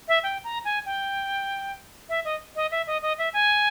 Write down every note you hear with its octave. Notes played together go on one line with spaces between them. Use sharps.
E5
G5
A#5
G#5
G5
E5
D#5
D#5
E5
D#5
D#5
E5
G#5